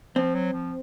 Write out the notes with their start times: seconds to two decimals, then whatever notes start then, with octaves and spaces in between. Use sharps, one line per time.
0.16 F3 C4
0.35 F#3
0.53 F3